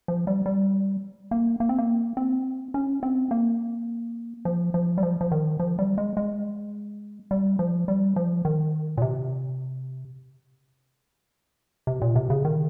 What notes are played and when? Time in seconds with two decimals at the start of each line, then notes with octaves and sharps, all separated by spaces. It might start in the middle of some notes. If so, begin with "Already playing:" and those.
0.08 F3
0.27 G3
0.46 G3
1.31 A#3
1.60 A#3
1.69 C4
1.78 A#3
2.17 C4
2.74 C#4
3.03 C4
3.31 A#3
4.45 F3
4.74 F3
4.98 G3
5.03 F3
5.21 F3
5.31 D#3
5.60 F3
5.79 G3
5.98 G#3
6.17 G#3
7.31 G3
7.59 F3
7.88 G3
8.16 F3
8.45 D#3
8.97 A#2
9.02 C3
11.87 C3
12.02 A#2
12.16 C3
12.30 C#3
12.45 D#3